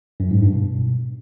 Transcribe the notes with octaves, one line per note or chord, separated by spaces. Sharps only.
F#2
G#2
G2
B2